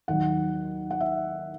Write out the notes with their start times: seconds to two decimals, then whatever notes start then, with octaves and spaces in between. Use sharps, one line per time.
0.08 D#2 D#3 F#3 F#5
0.91 F#5
1.00 E5